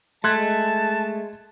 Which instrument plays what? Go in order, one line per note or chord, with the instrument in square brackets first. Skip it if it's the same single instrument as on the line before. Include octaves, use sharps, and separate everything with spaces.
[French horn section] G#3 [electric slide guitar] A3 [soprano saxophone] A5 [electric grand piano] C6 F#6 G#6